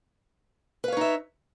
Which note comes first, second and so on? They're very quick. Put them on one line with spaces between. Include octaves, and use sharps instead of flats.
B4 F5 C#5 D#4 E5